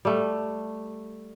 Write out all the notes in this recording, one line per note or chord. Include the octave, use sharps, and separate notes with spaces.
G3 A3